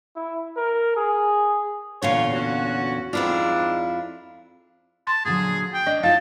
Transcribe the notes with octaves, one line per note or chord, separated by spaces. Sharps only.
E4
A#4
G#4
E2 A#2 D3 F4 C#5
C#4 F#4
F2 G#2 C4 D4 E4 F4
A5 C6
A#2 D3 F#3 G#4
G5
D4 D#5
D#4 F4 D#5 F5 A5